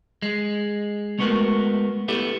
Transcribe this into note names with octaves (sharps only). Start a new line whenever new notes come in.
G#3
G#3 A3 B3 C#4 F#4 A#4
B3 E4 G4 A4